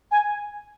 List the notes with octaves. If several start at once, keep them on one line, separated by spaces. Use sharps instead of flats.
G#5